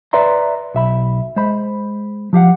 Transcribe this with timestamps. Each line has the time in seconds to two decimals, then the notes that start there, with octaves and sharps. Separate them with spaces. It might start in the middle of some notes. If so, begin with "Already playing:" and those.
0.13 B4 D5 E5 A#5 C6
0.75 B1 E5 B5
1.36 G#3 C5 B5
2.33 F3 G4 F5 F#5